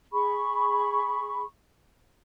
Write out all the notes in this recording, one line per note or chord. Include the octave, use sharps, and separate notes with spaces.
G#4 B5 C#6